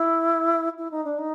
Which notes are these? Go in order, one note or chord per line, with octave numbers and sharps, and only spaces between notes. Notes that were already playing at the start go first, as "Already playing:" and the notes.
Already playing: E4
E4
D#4
D4
D#4